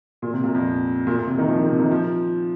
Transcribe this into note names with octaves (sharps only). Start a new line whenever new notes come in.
A#2
C3
A#2
F2
A#2
A#2
C3
D#3
F3
D#3
C3
D#3
F3